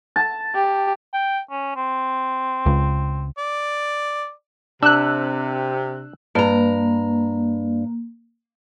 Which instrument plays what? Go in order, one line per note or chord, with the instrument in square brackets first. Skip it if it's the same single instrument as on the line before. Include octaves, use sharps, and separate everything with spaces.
[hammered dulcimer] A5
[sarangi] G4
[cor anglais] G5
C#4
C4
[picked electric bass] C#2
[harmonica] D5
[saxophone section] C3 [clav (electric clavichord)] D4 [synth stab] E6 F#6
[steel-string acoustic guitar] G2 A#5 [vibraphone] A#3